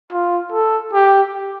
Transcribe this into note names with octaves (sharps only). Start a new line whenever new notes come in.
F4
A4
G4